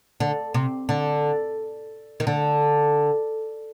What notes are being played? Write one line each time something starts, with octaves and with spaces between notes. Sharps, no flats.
D3
C3
D3
D#3
D3